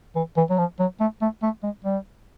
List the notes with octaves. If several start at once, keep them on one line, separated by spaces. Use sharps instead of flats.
E3
E3
F#3
F3
F#3
A3
A3
A3
G#3
G3